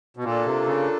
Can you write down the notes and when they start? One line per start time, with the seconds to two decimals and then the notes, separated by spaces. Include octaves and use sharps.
0.17 B2
0.24 A#2 A#3 D4 F4 A4
0.46 C3
0.66 C#3